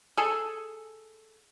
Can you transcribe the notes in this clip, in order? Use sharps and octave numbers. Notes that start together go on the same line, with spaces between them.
G#4 A4